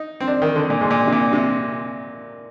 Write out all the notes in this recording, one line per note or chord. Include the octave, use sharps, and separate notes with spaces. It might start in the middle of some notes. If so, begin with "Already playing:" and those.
Already playing: D#4
C4
D4
D#3
D3
A#2
G#2
A#2
C3
A#2
C3